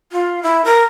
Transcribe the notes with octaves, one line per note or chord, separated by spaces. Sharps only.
F4
E4
A#4